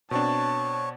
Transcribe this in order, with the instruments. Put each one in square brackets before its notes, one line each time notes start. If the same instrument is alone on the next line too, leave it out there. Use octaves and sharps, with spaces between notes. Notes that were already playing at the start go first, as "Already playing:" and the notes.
[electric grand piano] B2 C4 D4 [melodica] C#5 [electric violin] A5